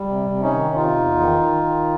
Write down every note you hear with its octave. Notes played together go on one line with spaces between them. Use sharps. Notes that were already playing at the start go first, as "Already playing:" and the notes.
Already playing: G3
C3
C3
C#4 D#4
D#3
C3 D#4 F4
E2
D#3
D#3
D#3